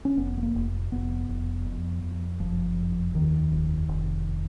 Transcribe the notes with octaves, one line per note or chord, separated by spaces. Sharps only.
C#4
F1 B3
B3
A#3
F1
F1 B3
F1
F2
F2
F#1 F3
F2
D#2 D#3
F1
F1